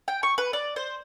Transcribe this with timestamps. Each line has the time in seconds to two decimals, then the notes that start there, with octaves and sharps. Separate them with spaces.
0.08 G5
0.23 C#6
0.38 B4
0.53 D5
0.76 C5